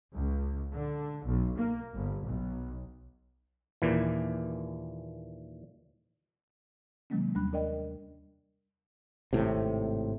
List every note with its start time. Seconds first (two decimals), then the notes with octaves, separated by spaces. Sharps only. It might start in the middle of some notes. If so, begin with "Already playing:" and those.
0.13 C#2
0.73 D3
1.25 B1
1.58 A#3
1.94 G1
2.26 B1
3.82 D#2 A#2 E3
7.10 C3 D#3 F#3 G#3 A#3 C#4
7.35 D#2 G3 D4 B5 F#6
7.52 D4 A#4 D5 D#5 G5
9.33 G#1 A2 C3